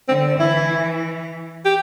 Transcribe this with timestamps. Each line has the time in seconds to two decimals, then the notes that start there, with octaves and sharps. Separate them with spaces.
0.09 D3 C4
0.39 E3 E4
1.65 G4